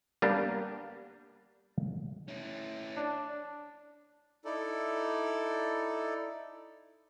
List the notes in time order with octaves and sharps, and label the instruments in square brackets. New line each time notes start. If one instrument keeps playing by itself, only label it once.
[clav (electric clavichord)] G3 A#3 B3 D4 G4
[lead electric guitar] C#4 E4
[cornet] D4
[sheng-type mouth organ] D#4 E4 A4 D5